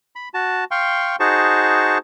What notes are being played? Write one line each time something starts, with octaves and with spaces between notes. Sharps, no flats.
B5
F#4 A5
F5 G5 C6 C#6
D#4 F#4 G#4 C5 A5 C#6